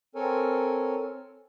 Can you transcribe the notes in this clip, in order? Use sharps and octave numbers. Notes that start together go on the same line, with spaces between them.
C4 A4 A#4 C#5 G#5